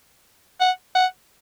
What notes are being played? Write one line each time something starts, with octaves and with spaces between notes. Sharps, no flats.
F#5
F#5